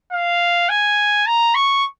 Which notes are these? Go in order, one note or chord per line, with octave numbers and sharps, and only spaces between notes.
F5
G#5
A#5
C#6